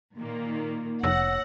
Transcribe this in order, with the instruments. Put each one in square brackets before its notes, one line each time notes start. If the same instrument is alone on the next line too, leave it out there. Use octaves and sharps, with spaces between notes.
[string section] A#2 D#3 A#3
[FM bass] F1 [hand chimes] C#5 E6 A#6 [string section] F#5